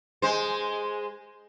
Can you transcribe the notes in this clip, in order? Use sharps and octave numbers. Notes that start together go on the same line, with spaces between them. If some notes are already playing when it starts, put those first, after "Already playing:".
G#3 C5